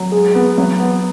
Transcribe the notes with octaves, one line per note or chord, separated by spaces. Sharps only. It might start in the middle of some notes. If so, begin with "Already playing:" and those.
Already playing: F#3
G#3
B3
F#3
B3